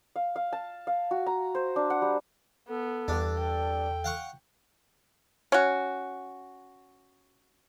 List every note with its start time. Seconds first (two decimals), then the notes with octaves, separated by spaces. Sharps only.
0.16 F5
0.36 F5
0.53 A5
0.87 F5
1.11 F#4
1.26 A#5
1.55 C5
1.76 D4
1.90 F#5
2.02 G3
2.69 B3 A4
3.08 E2 G2 D4
3.39 G5
4.04 F5 F#5 C#6
5.52 C#4 F#4